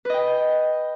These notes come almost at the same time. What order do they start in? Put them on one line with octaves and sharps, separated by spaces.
B4 D#5 G5